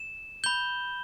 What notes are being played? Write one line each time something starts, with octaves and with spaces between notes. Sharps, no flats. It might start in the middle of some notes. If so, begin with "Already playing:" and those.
Already playing: E7
B5 G6 G7